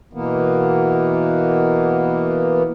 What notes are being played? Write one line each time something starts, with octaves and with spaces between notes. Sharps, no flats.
B2 E3 A#3 B3